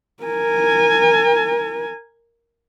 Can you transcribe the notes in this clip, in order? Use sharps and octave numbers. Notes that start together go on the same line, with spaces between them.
A#4 G#5